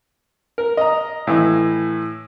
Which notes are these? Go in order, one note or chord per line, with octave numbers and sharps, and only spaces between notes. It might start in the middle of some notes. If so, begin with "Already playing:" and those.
A#4
D#5 A#5
A2 E3